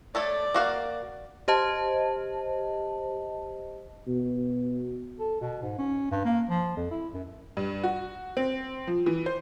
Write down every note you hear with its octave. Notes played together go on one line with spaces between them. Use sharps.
A3 A4 C#5 D5
A#3 F#4 F5
G4 C5 D#5 A5
B2
A4
B2
G#2
C#4
G2
A#3
F3
F2
E4
F#2
G2
F#4
C4
F3
E3
C5